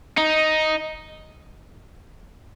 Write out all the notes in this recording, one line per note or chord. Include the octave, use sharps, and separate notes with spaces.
D#4